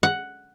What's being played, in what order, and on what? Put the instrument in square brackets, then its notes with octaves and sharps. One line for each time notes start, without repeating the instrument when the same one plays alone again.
[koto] F#5